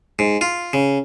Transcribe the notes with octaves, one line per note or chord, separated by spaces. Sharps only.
G#2
F4
C#3